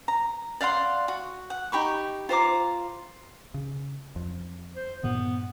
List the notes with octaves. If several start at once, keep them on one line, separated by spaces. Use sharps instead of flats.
A#5
D5 F5 F#5 C6
F#4
F#5
D#4 G4 B5 C#6
F4 C5 A#5 D6
C#3
F2
C5
G2 A#2 D#3 B3